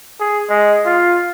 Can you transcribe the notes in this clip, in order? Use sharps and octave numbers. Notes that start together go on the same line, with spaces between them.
G#4
G#3
F4